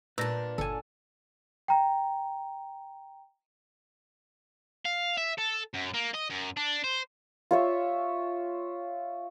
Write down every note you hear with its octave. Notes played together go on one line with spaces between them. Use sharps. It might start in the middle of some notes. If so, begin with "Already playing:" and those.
A#2 D4 B4 D5 A5 E6 G6 A#6
G1 A4 G#5
G5 A#5
F5
E5
A4
F#2
A#3
D#5
F#2
D4
C5
F4 C#5 E5